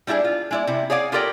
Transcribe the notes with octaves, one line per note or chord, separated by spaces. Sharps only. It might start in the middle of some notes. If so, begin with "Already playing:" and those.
G3 D4 E4 G4 G#4
F4
G#3 E4 D5
C3 E4
G#4 C#5 D5 F5 G#5
F4 G4 A4 A#4 D5 G5